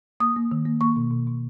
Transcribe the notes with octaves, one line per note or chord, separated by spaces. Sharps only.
A#3 D#6
A#3
D#3
A#3
A#3 C#6
B2
B2
B2